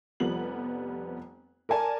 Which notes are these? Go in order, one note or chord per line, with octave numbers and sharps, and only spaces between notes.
F1 F3 G3 B3 F#7
A#4 D5 G#5 A5